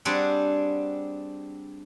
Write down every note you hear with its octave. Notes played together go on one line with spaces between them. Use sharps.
G3 C4 D4 G#4 F#5